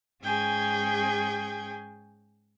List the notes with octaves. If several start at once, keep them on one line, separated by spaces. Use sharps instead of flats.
G#2 C#4 G#4 G5 G#5 G#6